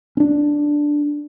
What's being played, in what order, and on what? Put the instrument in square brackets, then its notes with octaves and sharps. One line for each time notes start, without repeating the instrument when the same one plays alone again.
[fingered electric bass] C#4 D4